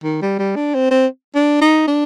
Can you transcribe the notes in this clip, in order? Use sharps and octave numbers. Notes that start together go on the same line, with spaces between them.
D#3
G3
G3
D4
C4
C4
D4
D#4
D4